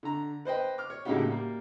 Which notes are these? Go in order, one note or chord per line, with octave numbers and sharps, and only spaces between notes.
D3 A#5
B4 C5 D#5 G5
D6 F6
C#5
A2 C#3 A#3 D#4 F#4 G4
G3 A#3